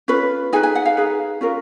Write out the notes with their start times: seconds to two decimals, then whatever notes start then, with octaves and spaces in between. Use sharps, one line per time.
0.08 C#4 F4 B4
0.53 D#4 G#4 B4 G#5
0.63 G#5
0.75 F#5
0.85 F5
0.97 D#4 G#4 B4
1.41 C#4 F4 A#4